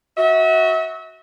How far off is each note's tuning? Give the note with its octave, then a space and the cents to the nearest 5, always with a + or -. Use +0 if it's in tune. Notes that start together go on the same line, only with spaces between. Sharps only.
F#4 +0 E5 -35